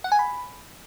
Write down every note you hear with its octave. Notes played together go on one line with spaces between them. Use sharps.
F#5
G#5
B5